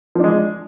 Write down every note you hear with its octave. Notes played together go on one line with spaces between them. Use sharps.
F3 G#3 D4